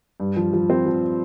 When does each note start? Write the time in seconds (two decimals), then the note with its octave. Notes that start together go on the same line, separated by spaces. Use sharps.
0.20 G2
0.36 F3
0.53 F3
0.70 C4
0.86 F3